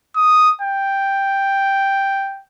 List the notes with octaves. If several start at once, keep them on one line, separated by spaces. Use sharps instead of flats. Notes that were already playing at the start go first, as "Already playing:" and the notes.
D#6
G5